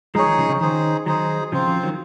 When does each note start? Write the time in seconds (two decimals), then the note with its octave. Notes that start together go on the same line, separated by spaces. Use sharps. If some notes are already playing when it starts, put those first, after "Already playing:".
0.15 F3 G#3 D#4 G#4 C#5
0.26 D#3
0.38 C#3 F3
0.49 C#3 F3
0.60 D#3 D#4 G#4 C5
1.06 D#3 F#3 D#4 G#4 C5
1.52 C#3 F3 C4 F4 C5
1.68 C#3 F3
1.83 D#3 F#3